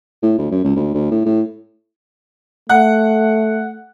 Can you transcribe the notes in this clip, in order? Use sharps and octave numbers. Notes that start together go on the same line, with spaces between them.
A2
D2
F#2
C#2
D2
D2
A2
A2
A3 F#5